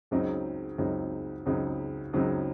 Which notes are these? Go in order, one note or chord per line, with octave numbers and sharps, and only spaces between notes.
C#2 C#3 F#3 C4 D#4
C#2 C#3 F#3 C4 D#4
C#2 C#3 F#3 C4 D#4
C#2 C#3 F#3 C4 D#4